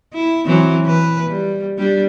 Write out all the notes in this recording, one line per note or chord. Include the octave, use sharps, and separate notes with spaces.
E4
E3 F#3 C4
E3 B4
G3
G3 D4 G4